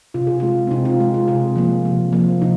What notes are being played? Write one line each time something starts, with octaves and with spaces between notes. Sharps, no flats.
C3 F4
G#4
G#3 F4
C4
C3 D#4
F4
G#3 G#4
F4
C3 G#4
F3 A#3
C3
F3 A#3
C3 D#4